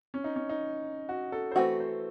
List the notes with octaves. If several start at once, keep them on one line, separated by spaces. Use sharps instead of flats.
C#4
D#4
C#4
D#4
F#4
A4
C5
E3 A3 C4 F#4 A4
C5